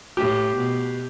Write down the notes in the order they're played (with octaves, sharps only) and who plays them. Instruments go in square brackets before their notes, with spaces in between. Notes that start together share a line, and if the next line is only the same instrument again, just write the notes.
[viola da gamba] A2 [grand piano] G4
[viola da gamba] B2